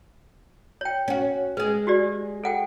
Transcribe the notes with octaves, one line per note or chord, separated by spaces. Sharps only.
C#5 G5
C#4 F#4
G#3 G#4 B4
F#4 G4 D5
A4 F#5 G5